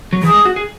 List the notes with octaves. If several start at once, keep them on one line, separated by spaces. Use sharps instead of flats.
F#3
E3 G#4
G#3
F#4
G#4